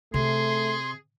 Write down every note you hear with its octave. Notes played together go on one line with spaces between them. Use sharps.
C3 A3 G#4 C6